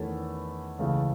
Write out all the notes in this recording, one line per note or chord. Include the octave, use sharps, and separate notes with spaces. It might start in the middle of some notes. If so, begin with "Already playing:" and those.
Already playing: E2 D#3 A3 C#4 E4
C#2 C#3 E3 A3